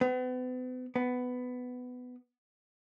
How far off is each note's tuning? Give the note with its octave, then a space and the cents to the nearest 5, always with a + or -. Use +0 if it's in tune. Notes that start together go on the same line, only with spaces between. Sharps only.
B3 +40
B3 +15